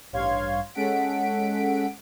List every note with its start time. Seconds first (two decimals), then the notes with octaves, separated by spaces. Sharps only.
0.12 A1 G2 C#5 F5 C6 G#6
0.74 G#3 C#4 A4 F#5 B6 D7